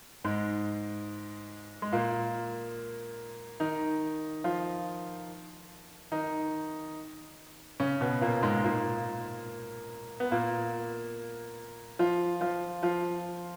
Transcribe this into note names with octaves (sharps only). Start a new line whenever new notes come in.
G#2 G#3
G#3
A#2 A#3
D#3 D#4
F3 F4
D#3 D#4
C#3 C#4
B2 B3
A#2 A#3
G#2 G#3
A#2 A#3
B3
A#2 A#3
F3 F4
F3 F4
F3 F4